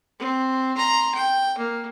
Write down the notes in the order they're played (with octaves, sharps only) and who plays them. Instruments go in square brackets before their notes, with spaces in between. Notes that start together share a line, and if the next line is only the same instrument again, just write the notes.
[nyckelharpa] C4
A#5 C6
G5
A#3